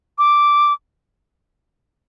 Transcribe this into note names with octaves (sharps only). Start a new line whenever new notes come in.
D6